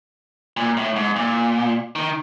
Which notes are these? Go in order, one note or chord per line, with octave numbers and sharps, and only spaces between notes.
A#2
A2
G#2
A#2
D#3